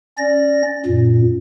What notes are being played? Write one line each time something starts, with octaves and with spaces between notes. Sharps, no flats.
C#4 D5 A#6
F#2 A#2